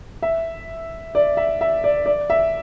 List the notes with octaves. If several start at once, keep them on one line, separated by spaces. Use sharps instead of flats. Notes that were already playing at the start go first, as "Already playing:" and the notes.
E5
D5
E5
E5
D5
D5
E5